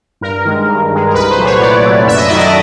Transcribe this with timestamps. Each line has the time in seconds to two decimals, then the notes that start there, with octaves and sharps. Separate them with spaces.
0.21 G2 A#4
0.45 D#3 G#3
0.68 G2
0.91 D#3 G#3
1.09 A#4
1.14 C2 B4
1.30 C5
1.38 A#2 F#3 A3
1.45 C#5
1.61 C2 D5
1.84 A#2 F#3 A3
2.07 F#2 E5
2.17 D#5
2.28 D#3 F#3 A3 D5
2.38 D#5